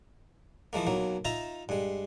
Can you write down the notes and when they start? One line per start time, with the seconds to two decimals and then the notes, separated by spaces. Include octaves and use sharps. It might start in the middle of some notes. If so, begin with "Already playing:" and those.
0.73 E3 F3 G#3 A#3
0.87 B1 F#3 A#3
1.25 D#4 F4 E5 A#5
1.69 G2 G#3